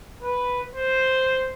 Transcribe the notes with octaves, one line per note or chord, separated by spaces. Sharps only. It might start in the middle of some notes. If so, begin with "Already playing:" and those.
B4
C5